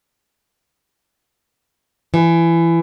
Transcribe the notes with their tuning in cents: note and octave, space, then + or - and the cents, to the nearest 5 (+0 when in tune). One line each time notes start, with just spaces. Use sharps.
E3 +20